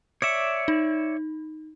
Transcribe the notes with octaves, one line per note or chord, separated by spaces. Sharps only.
C#5 D5 E5 D6 C#7
D#4